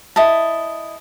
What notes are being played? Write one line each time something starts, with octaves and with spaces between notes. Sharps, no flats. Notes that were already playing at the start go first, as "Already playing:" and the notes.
E4 D#5 A5